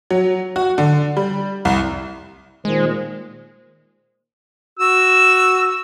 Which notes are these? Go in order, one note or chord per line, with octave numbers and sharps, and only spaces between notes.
F#3
F#4
D3
G3
C2
A#2 D#3 G#3 C5
F#4 E6